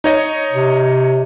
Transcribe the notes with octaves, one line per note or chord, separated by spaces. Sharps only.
D#4 C#5 D#5
C3